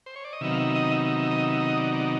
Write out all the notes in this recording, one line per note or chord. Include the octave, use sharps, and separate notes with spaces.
C5
C#5
D5
D#5
C3 D#3 F#3 B3 D#4 E5
F5
E5
D#5
E5
E5
E5
D#5
E5
D#5
D5
D5